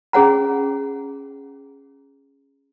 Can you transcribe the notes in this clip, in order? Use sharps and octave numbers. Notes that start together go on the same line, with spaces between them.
C#4 G#4 C#5 F#5 A#5